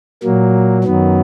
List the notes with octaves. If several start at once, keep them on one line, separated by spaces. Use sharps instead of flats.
A#2 F#3 A#3
F#2 D#3 F#3 B3